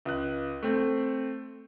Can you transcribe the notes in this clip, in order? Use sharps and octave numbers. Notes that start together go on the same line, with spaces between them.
C#2 F#6
A3 C4